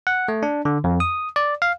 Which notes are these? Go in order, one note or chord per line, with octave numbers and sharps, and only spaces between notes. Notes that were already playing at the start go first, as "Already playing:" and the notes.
F#5
A3
D4
D3
F2
D#6
D5
F5